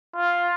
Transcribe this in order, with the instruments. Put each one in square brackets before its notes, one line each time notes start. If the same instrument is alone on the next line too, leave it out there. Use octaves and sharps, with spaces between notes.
[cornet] F4